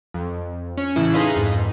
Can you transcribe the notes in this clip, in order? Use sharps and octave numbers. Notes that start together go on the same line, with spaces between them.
F2
C#4
A2 C#3 E3 E4
D#4 G#4 B4 D#5 F5 C6
F2 G#2